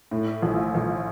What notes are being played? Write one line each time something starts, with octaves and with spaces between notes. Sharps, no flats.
A2
A#1
A#1